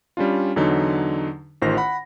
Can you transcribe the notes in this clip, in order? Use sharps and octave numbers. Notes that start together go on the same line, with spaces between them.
G3 C#4 D4 F4
E2 D3 F#3 D#4
A1 D#3 F4 C5 A#6
F#5 B5